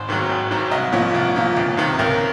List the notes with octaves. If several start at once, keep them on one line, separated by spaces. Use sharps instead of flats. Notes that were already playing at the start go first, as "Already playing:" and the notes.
Already playing: G#1 C5
G#2 D#3 F#3
G#1
G#2 D#3 F#3
C2 D#5
A#2 F3 C#5
C2
A#2 F3
C#2
C3 D#3
C#2 A#4